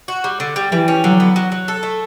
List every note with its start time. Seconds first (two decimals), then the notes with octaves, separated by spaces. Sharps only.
0.08 F#4
0.24 G3
0.40 D3
0.56 G3
0.72 E3 G3
0.88 C#4
1.04 D3 F#3
1.20 B3
1.36 F#3
1.52 F#3
1.68 A4
1.83 A3